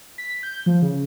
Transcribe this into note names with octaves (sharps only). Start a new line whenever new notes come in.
B6
G6
F3
C#3